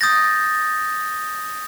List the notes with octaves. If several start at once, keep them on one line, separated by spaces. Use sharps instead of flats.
D#6 G6 A6 A#6